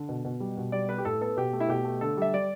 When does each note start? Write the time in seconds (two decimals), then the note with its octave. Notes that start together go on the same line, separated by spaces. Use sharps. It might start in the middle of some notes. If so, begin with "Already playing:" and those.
Already playing: D3
0.09 B2
0.25 B2
0.40 G3
0.57 B2
0.72 G3 D5
0.89 B3 B4
0.98 G4
1.05 A2 A4
1.21 B3 A4
1.37 B2 G4
1.53 A3
1.60 E4
1.68 B2 G4
1.85 A3
2.01 D3 A4
2.17 G3 E5
2.34 G3 D5